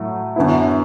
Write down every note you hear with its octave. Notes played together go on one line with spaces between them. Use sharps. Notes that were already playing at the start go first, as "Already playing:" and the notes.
Already playing: A2 F#3 A3
F#2 D3 B3 E4